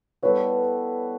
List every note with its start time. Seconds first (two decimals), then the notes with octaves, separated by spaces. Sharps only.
0.22 G3 B3 E4 A4 B4 C#5